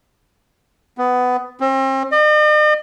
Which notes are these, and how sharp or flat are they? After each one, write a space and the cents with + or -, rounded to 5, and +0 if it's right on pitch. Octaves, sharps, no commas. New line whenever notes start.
B3 +15
C4 +40
D#5 -45